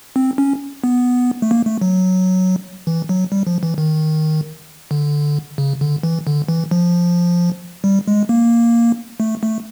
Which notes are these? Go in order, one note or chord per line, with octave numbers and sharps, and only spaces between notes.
C4
C#4
B3
A3
A#3
A3
F#3
E3
F#3
G3
F3
E3
D#3
D3
C#3
D3
E3
D3
E3
F3
G3
G#3
A#3
A3
A3